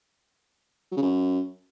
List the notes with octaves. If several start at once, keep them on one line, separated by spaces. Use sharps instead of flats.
F#3
C#3
F#2